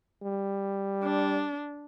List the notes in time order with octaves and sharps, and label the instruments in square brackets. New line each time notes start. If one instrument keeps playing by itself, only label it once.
[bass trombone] G3
[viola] D4